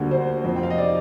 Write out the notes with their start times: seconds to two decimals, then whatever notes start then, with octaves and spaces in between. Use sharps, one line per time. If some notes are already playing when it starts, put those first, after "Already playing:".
Already playing: D2 D3 G3 A#3
0.11 C5
0.44 F2 C3 F3 C4
0.56 G5
0.63 F5
0.70 D#5
0.78 D5